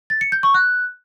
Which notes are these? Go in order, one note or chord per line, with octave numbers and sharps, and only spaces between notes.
A6
C#7
G6
C#6
F#6